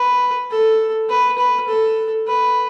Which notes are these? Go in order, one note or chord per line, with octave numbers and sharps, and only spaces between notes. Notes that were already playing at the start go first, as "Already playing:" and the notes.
Already playing: B4
A4
B4
B4
A4
B4